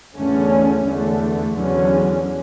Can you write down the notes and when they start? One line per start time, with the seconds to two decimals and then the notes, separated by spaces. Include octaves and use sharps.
0.15 E2 D3 A3 C#4
0.85 E2 D3 A3
1.56 E2 D3 F#3 C#4